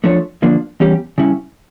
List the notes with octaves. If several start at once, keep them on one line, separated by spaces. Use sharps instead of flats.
F3 A3 D4 A4 C#5
D3 F3 A#3 D4
E2 C#3 G3 C#4 G4
C#3 G3 C#4 E4